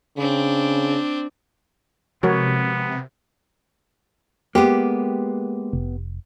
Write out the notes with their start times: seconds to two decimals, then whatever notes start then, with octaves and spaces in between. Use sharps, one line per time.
0.17 C#3 C4 D4
2.23 C3 F3 G#3 B3 F#4 A#4 C#5
4.55 G#3 A#3 B3 G4
5.73 F1